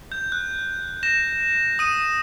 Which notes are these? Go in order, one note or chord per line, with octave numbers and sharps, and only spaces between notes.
G6
F#6
A#6 E7
D#6 D#7